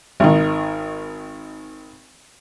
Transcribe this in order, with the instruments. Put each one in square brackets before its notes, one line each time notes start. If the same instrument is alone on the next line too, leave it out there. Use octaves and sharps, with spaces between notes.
[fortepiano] G#1 D#3